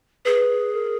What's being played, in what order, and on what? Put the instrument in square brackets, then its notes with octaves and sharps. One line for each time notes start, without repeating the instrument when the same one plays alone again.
[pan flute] G#4 [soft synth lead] B4
[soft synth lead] A#4